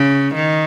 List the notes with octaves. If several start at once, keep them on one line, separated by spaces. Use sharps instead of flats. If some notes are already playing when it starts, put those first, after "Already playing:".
Already playing: C#3
D#3